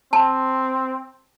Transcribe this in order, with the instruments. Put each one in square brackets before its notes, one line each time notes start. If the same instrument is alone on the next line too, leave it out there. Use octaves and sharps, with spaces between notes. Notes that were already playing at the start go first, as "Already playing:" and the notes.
[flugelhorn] C4 [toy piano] A5